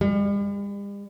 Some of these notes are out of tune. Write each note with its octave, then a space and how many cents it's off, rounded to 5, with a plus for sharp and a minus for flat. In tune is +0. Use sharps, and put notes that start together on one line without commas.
G3 +45